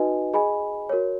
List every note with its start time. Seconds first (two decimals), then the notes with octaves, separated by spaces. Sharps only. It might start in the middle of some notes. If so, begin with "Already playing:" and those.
Already playing: D#4 F#4 B4 D#5 G#5
0.34 G#4 D#5 G#5 B5
0.89 F#4 A#4 C#5